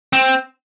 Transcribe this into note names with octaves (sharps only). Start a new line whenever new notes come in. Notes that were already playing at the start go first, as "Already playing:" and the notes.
C4